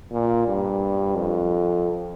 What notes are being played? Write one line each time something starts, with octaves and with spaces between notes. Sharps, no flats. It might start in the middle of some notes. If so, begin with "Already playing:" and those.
A#2
G2
F2